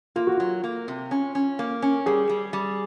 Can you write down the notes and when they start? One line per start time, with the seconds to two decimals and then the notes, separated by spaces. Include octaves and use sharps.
0.16 A#3 F4
0.27 F#4
0.37 F#3 F4
0.64 A#3
0.88 C3
1.11 C#4
1.35 C#4
1.59 A#3
1.82 C#4
2.06 G3 G#4
2.29 G3
2.53 G3